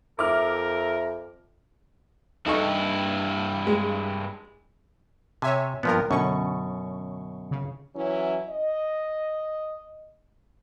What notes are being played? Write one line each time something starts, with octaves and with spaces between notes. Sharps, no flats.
F2 A#4 E5 D6 F6
G2 D#4 E4 A4 C#6
G#3
C3 C#5 E5 G#5
G2 A#2 F3 B3 A#4
F#2 B2 D3 C#4 C#6
C#3
E3 F#3 C#4 E4
D#5